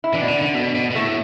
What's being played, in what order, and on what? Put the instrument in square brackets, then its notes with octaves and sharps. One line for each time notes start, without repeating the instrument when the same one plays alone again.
[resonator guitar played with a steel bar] E4
[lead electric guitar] E3 [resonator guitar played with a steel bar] D4
[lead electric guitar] B2
D3
D3
B2
B2
B2
[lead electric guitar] A2 [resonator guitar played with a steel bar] A3